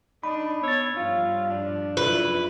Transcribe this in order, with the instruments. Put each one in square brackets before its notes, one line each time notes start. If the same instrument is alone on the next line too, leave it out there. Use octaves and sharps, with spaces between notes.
[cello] D4 [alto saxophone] D#4 [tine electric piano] B5
[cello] B3 [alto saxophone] C#5 [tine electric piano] E6 A6
[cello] G2 F3 [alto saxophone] F4
[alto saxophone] D4
[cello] F#2 E4 [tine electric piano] F4 [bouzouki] B4